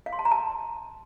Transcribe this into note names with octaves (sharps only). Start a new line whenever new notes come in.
F5
C6
A5
A#5
A5